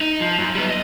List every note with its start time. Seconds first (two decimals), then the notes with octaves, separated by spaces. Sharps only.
0.01 D#4
0.20 F3
0.38 F#2
0.55 G3 B3
0.69 D#5